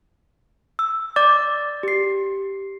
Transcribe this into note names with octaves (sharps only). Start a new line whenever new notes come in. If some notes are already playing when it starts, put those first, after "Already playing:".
E6
D5 D6 A6
G4 C7